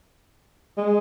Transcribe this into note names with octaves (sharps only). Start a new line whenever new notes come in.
G#3